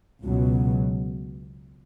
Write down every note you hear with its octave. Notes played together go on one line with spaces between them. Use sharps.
C#2 B2 F#3